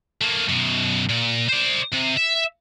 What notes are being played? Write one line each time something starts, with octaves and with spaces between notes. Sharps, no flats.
A3 A#3
F#2 B2
A#2
C5 D5
C3
E5